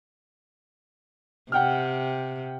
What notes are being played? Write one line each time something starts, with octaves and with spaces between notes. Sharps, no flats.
C3 F#5 G5 F6